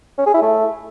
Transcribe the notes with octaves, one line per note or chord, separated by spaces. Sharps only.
C#4
G#4
E4
A3